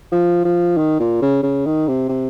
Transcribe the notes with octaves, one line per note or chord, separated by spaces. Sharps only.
F3
F3
D#3
A#2
C#3
C#3
D#3
C3
C3